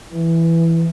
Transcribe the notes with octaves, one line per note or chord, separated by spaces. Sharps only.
E3